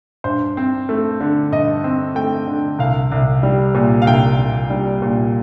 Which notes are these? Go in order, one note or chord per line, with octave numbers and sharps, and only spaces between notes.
G2 C5
C4
A3
D3
G2 D#5
C4
A3 G5
D3
C2 F5
C2
G3
A#2
F5
C2 G5
C2
G3
A#2